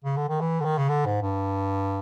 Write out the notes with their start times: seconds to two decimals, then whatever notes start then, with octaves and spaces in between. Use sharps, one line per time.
0.05 C#3
0.17 D3
0.29 D#3
0.41 E3
0.60 D3
0.65 D#3
0.78 C#3
0.89 D3
1.06 G#2
1.22 G2